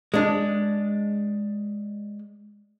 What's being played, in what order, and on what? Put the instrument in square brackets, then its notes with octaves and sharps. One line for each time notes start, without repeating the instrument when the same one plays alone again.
[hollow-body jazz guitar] G#3 D4